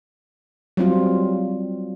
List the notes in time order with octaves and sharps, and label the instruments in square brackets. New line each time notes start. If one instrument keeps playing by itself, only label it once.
[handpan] F#3 G3 C4 F4